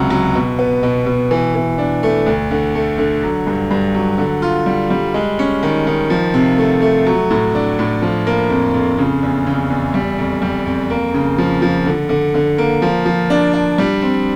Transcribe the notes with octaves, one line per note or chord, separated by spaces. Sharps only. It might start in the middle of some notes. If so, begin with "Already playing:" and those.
Already playing: C#2 C3 F#3
F#3
B2
B3
B2
B2
E3
E3
D4
A3
D2
D3
A3
D3
F#3
G2
G2
F#3
D3
F4
G3
G3
G#3
C#4
D#3
D#3
F3
C3
A3
A3
F#3
A2
D4
A2
F3
A#3
F2
F2
C#3
E2
C#3
E2
G3
F2
G3
F2
A#3
C#3
F3
F3
D3
D3
D3
A#3
F3
F3
D4
D4
G3
C4